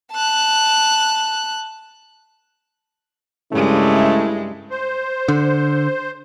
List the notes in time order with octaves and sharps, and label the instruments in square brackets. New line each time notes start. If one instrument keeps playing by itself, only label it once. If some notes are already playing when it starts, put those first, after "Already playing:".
[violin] A5 F#6
[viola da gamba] G2 G#3 [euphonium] C#3 [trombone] A3 [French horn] E4
[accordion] C5
[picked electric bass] D3